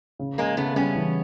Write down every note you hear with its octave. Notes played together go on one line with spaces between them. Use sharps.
C#3
C#3 G#3 A#3
C#3 A3 B3
G3 B3 C#4
E3